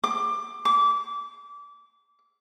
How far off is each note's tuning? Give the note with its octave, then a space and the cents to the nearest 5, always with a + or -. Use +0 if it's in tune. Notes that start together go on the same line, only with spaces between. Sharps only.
D6 +20
D6 -25